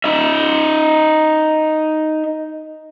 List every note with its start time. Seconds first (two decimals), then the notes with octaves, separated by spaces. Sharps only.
0.04 D#4 E5